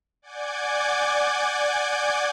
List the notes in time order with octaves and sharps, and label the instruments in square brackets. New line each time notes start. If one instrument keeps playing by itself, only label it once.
[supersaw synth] D5 F#5 G#5 D6 G6 G#6